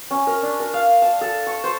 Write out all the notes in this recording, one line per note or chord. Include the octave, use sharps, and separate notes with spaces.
C#4
A#4
D4
A#4
F5
A5
A4
C#6
C5